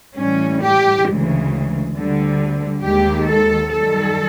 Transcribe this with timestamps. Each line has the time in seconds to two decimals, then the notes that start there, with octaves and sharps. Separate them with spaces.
0.17 A2 E3 G3 C#4
0.62 G4
1.05 D2 C#3 E3 G#3
1.94 D2 D3 G3
2.83 D#2 D#3 G#3 G4
3.27 A4
3.72 F#2 D#3 G3 A4